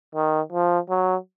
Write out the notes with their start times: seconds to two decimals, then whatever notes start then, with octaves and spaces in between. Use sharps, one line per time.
0.15 D#3
0.53 F3
0.90 F#3